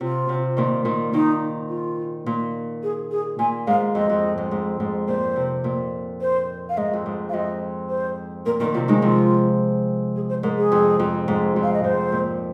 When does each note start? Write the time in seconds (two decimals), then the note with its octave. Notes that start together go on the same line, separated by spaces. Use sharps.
0.01 C3 F4
0.29 C3
0.57 A#2 D#3
0.85 A#2 D#3
1.13 A#2 D#3 D#4
1.69 F4
2.26 A#2
2.83 G#4
3.11 G#4
3.39 A#2 G#5
3.67 G#2 F5
3.95 F2 D#5
4.10 F2
4.38 G#2
4.51 G#2
4.80 G#2
5.08 A#2 C5
5.36 C3
5.64 A#2
6.21 C5
6.69 F5
6.77 G#2 D#5
6.93 F2
7.06 G#2
7.29 F5
7.34 F2 D#5
7.89 C5
8.46 A#2 A#4
8.60 A#2 D#3 A#4
8.74 C3 F3 F4
8.88 D#3 G#3 D#4
9.02 C3 F3 F4
10.16 G#4
10.29 C5
10.43 G#2 A#4
10.57 G#4
10.72 F2
10.99 F2
11.28 G#2
11.56 F2
11.63 F5
11.73 D#5
11.84 G#2 C5
12.12 A#2